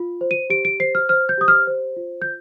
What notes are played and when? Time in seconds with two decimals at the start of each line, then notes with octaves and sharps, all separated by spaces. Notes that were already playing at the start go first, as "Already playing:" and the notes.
Already playing: F4
0.21 C5
0.31 D#7
0.50 G4 D7
0.65 D7
0.80 C5 C7
0.95 F6
1.09 C5 F6
1.29 G6
1.38 G4 D#6
1.48 F6
1.67 C5
1.97 F4
2.22 G6